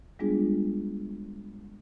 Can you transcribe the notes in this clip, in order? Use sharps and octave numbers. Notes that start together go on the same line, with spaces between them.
G3 G#3 B3 D4 F4 G#4